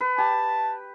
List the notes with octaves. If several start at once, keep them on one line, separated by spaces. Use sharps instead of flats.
B4
G4 A5